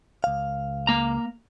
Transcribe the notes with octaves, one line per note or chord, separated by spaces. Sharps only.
C#2 F5
A#3 A#5